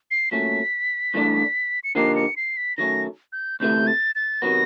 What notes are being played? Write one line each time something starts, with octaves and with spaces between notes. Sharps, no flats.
C7
C2 A#2 F#3 A3 C#4 B6
G2 E3 A3 D4
C#7
D3 F3 A#3 D#4 G4 C7
C#7
C7
B6
D#3 F#3 A3 C#4 A#6
G6
D2 C3 E3 A3 G6
A6
A6
C3 D#3 F#3 B3 A#6